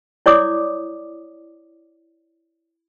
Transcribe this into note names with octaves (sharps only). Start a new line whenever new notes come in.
E4 C#5 D5 D6 D#6